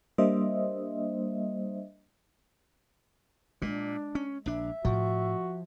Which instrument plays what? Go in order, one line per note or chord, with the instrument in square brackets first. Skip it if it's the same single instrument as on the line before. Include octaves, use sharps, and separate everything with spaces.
[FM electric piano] G3 A#3 D4 C5 D#5 E5
[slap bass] A#2 [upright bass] G#3 [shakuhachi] D4
[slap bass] C#4
[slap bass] A#1 D4 [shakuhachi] E5
[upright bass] A2 [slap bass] F3 [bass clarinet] F#4